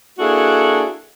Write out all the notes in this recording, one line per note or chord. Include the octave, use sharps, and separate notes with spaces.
A#3 D4 E4 F#4 G#4 A4